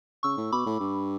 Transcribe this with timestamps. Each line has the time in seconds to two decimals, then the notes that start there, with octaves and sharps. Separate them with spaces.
0.23 C#3 C#6 E6
0.37 A2
0.52 B2 B5 D6
0.66 A2
0.80 G2